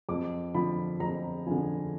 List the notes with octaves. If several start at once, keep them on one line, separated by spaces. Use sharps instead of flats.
F2 D6
D3 F3 B5
F2 A#5
D3 F3 G#5